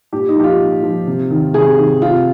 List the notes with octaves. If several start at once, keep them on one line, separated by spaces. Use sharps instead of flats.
A#2 G4
D#4
F3 G4
F4
A#2
F3
C3
D#3
C3 G#4
D#3
C3 F4